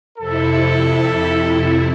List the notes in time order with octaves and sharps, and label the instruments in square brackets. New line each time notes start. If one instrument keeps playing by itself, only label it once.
[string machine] F2 C3 E4 [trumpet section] A4